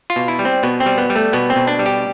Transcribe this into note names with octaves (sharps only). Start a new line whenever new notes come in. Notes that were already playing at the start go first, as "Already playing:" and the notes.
F4
B2
E4
G3
C4
B2 B3
C4
G3
B3
G3
A3
B2 B3
C4
B2
D4
G3
G4